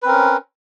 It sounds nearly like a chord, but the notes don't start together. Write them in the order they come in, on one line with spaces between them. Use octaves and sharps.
B4 C4 A#4 C#4